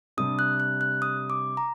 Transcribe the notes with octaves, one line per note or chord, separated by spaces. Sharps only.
C3 G3 D4 D#6
F#6
F#6
F#6
D#6
D6
A#5